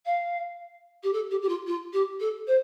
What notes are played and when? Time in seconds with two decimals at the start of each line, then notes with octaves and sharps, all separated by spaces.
0.05 F5
1.03 G4
1.13 A4
1.30 G4
1.42 G4
1.48 F4
1.67 F4
1.93 G4
2.20 A4
2.47 C5